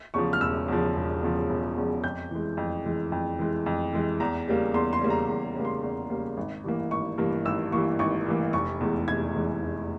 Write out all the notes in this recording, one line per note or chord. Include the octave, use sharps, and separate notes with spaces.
E2 C#3 F3 C#6
F6
E1 E6
E2 C#3 F3
E1
E2 C#3 F3
E1
E2 C#3 F3
F2 G6
E3 G#3
F2
E3 G#3
F2
E3 G#3
F2
E3 G#3
E2 A#5
C#3 G3 A#3
E2 C6
C6
C#3 G3 A#3
A#5
E2
C#3 G3 A#3
C6
E2
C#3 G3 A#3
G#1
G2 E3 A#3
G#1 C#6
G2 E3 A#3
G#1 E6
G2 E3 A#3 C#6
G#1 C#6
G2 E3 A#3
F1 C#6
E2 E3 G#3
F1 G#6
E2 E3 G#3
F1